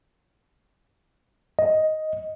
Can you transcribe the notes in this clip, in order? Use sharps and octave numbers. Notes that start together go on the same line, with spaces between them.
D#5